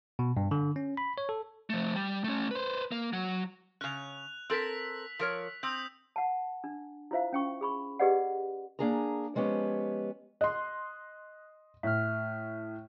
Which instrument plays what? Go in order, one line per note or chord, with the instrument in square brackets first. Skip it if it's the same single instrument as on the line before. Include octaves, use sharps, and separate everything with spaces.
[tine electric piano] B2
G2
D3
C#4
B5
C#5
A4
[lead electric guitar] F3 A3
G3
A3 C#4
B4 C5
A#3
F#3
[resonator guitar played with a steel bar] C#3 C#4 [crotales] F#6 F7
[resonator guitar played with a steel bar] C4 A4 A#4 [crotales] E6 B6
[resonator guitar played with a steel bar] F3 A#4 C#5
[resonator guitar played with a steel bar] C4 [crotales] D#6 E6 G6
[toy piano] F#5 A5
D4
E4 F4 C5 E5 F5
C#4 G5 C#6
G#4 B5 C#6
G4 G#4 B4 D5 D#5 F#5
[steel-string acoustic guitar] A#3 D4 G#4 G#5 A#5
F3 G#3 B3 C#4 G4
[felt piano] D#5 C6 [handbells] F#6
[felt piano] A2 [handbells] E5 F6